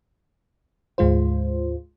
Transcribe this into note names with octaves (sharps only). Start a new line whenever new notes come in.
D2 G#2 G#3 F4 C5